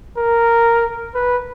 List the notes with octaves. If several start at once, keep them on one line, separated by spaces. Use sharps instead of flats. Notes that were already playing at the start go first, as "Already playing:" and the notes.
A#4
B4